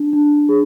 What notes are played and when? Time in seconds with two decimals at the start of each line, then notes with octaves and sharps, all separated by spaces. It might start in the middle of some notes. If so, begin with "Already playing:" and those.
Already playing: D4
0.13 D4
0.49 G#4